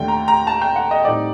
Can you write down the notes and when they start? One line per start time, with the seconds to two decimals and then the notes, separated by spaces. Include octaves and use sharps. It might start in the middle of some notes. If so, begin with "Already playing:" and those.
Already playing: D#2 D3 A3 G5
0.08 A#5
0.28 A#5
0.47 A5
0.61 G5
0.76 F#5
0.91 D#5
1.05 A2 G3 C4 D#4 D5